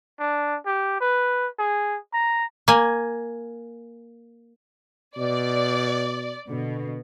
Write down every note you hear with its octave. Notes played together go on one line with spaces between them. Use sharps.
D4
G4
B4
G#4
A#5
A#3 G#5
B2 D5
B2 D3